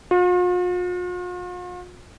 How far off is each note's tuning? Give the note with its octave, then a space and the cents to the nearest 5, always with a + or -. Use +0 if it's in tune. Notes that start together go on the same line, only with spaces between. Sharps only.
F4 +45